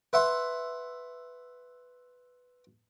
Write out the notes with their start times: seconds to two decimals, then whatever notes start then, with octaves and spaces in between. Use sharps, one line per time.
0.13 B4 E5 F#5 C6